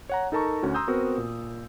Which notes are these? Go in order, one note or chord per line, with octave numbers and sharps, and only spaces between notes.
C#5 F#5 A#5
D#4 A4 A#4 A5 A#5 C#6
D2 C#4 F#4
A#5 C6 D#6 E6 G6
B3 C4 F#4 A#4 C5
A#2